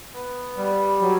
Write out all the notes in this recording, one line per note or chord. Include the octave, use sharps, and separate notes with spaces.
B3
G3
F#3